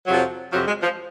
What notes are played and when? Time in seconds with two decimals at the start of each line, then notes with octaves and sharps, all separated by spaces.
0.07 F2 C3 F3 F#3
0.52 F2 C3 F3 F#3
0.67 G#3
0.83 F3